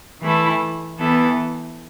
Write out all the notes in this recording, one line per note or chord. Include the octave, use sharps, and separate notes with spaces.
E3 A3 E4 A4
E3 B3 E4 A4